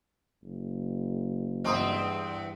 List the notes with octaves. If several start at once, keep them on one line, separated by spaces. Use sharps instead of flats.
F#1
E2 G2 C4 D#5 C6 D#6